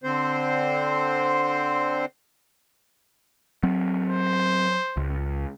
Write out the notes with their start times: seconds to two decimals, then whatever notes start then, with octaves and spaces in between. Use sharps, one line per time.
0.04 D3 C4 C5
3.63 F#3 C4
4.08 C5
4.97 C#2